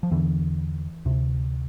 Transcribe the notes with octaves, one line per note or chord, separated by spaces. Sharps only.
F3
E2 D3 E3
D2 C3